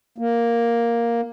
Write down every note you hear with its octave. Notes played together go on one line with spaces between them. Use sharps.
A#3